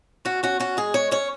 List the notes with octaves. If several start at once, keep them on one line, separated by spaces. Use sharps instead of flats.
C#4 F#4
C#4 F#4
C#4 F#4
G#3 G#4
G#3 C#5
C#4 C#5